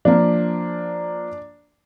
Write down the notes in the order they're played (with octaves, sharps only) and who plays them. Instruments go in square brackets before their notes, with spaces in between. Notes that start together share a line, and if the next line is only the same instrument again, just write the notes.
[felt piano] F3 A#3 [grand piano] D4